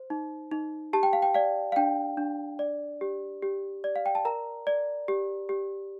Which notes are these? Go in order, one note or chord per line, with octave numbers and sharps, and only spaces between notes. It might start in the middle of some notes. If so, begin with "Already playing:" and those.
Already playing: C5
D#4
D#4
G4 A5
G5
F5
G5
D5 F5
F5
D4 G5
D4
D5
G4
G4
D5
F5
G5
A5
A#4 A#5
D5
G4
G4